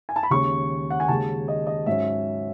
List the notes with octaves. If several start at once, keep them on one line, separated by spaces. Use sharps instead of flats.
G#5
A5
B5
D#2 C#3 G#3 C#4 C#6
F#5
G#5
D#2 C#3 G#3 A5
D#5
D#5
G#2 F#3 C#4 E5